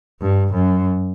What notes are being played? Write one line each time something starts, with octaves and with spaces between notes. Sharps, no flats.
G2
F#2